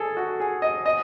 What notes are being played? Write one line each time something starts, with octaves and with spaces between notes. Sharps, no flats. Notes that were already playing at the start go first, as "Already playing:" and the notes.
Already playing: G#4 A4
F#4
G#4
D#5
D#5